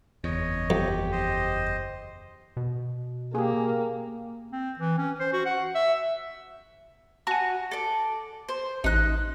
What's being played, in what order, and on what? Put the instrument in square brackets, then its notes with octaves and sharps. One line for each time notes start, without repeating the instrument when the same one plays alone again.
[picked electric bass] F#1 E2 [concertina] C#5 D#5
[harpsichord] F2 [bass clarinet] G4
[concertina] C5 D#5
[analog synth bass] B2
[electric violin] A#3 [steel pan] G4 G#4
[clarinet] C4
E3
C#4
C5
F#4
F#5
E5
[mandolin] F#4 [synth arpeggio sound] G#5 A5
[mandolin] A4 D5
C5
[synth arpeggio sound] A1 [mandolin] D#4 F#6